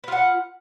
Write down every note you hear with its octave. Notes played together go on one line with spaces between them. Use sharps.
F4 B4 F#5